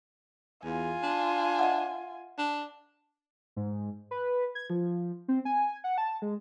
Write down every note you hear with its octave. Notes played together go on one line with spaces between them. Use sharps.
E2 F4 G#5
D4
D#5 E5 F#5
D4
G#2
B4
G#6
F3
C4
G#5
F#5
A5
G#3